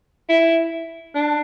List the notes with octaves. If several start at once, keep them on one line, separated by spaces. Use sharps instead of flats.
E4
D4